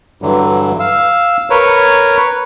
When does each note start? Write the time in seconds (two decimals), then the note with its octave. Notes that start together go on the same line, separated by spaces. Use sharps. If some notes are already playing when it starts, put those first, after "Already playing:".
0.22 G2 D3 E3 F#3
0.79 F5 E6
1.50 A#4 B4 C#5